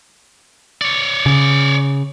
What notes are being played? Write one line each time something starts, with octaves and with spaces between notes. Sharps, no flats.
C#5 D5
C#3